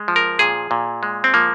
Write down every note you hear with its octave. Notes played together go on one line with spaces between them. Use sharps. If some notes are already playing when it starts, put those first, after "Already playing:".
Already playing: G#3
F3
A#4
A#2 G#4
A#2
G#3
C4
F3 A#3